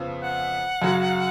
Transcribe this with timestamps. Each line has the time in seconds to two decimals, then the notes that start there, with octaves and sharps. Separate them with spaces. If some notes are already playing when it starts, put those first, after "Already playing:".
Already playing: F2 C#3 F3 B3
0.23 F#5
0.82 F#2 C#3 F#3